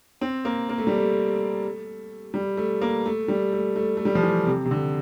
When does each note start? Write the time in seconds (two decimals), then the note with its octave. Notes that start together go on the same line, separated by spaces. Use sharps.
0.21 C4
0.45 A#3
0.69 A#3
0.78 A3
0.87 G3
0.97 A3
2.34 G3
2.57 A3
2.81 A#3
3.06 A3
3.28 G3
3.53 A3
3.76 A3
3.97 A3
4.05 G3
4.15 F3
4.23 E3
4.47 C3
4.65 C3
4.71 D3